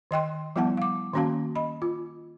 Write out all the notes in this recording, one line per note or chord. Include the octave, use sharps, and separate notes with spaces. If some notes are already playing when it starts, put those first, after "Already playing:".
D#3 D#5 G5 C6
F3 G3 B3 E4 F#5 A5
F5 D6
D#3 A#3 C#4 F#4 F5 A5
D#5 B5
F4